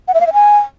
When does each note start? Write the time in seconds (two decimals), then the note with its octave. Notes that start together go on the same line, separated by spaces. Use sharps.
0.08 F#5
0.14 E5
0.21 F5
0.27 E5
0.33 G#5